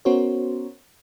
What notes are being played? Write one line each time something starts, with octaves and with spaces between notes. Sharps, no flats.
B3 C#4 F#4 A#4 C5 C#5